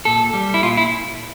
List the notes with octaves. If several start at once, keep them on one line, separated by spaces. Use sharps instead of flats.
A#2 A4
G3
E4
A#2 F4
E4